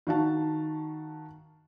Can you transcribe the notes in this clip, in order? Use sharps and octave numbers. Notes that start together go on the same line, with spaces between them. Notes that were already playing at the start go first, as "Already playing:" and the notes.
D#3 F#4 F5 A5